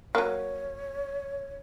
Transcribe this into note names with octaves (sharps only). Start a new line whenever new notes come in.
F#3 A#3 C#5